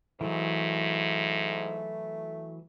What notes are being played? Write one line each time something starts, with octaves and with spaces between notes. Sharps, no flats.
G#2 E3 F#3 A3